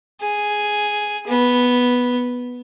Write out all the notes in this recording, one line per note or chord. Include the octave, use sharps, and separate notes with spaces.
G#4
B3